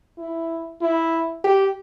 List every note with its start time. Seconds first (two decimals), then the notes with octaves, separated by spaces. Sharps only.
0.18 E4
0.82 E4
1.44 G4